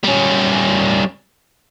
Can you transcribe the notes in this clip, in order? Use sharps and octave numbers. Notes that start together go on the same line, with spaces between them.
G3 C#4